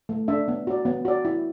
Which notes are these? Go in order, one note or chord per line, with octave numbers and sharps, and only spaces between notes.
A3
D4 A4 E5
B3
F#4 D5
B3
F#4 D5
E4